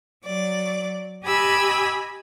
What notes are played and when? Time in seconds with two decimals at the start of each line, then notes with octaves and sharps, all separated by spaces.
0.25 F#3 D5
1.23 G4 D#5 G#5 B5 E6